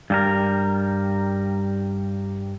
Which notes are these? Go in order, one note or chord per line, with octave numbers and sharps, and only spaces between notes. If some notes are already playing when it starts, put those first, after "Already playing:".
G2 G3 A#4